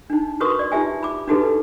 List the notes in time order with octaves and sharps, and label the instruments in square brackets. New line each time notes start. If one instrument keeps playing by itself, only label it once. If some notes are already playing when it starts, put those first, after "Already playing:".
[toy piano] D4 D#4
F#4 A#4 B4 C6 C#6 D#6
D5
D#4 F4 G4 E5 G#5
B5 D6
D4 D#4 F#4 G4 A4 B4